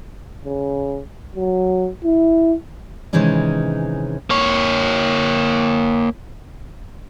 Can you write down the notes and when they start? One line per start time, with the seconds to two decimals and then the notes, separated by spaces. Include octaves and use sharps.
0.45 C#3
1.35 F#3
2.04 E4
3.13 C3 D#3 E3 G#3 C#4 D#4
4.30 A#3 C#5